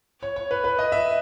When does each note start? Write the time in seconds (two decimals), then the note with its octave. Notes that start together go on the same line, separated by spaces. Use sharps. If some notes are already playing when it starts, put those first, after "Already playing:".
0.23 C#5
0.36 C#5
0.51 B4
0.64 B4
0.79 D#5
0.92 E5